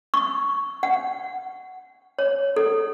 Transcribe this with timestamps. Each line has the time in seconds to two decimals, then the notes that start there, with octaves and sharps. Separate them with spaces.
0.14 C#6
0.83 F#5
2.19 C#5
2.56 A4